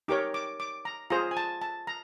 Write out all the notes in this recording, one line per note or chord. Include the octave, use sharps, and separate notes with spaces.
D#4 G4 A#4 C#5 D6
D6
D6
A#5
F4 G#4 C5 A#5
G#5
A5
A5
A#5